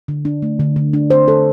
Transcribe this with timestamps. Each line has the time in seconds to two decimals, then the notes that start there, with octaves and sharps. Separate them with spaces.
0.08 D3
0.25 D4
0.42 A3
0.60 D3
0.76 D3
0.93 D4
1.10 C5
1.28 A4